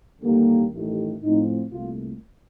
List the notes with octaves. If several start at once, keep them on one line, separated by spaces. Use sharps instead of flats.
D#2 D3 G3 A#3
A1 G2 D#3 A3
A2 F3 C4 D#4
C2 A#2 A3 F4